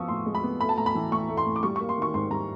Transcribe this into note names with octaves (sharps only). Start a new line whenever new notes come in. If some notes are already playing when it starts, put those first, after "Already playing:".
Already playing: F3 B3 C#6 D#6 E6
A2 C6
G#3
B5
B3
A3 B5
A5
A2 A#5
B5
E3
A2 C#6
A3
C6
A2
D6
G3 C#6
A#3 C#6
C6
D#3 C#6
G#2 C6
G3 A#5